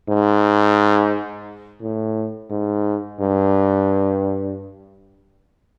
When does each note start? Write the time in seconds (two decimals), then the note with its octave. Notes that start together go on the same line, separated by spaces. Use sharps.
0.09 G#2
1.81 A2
2.50 G#2
3.20 G2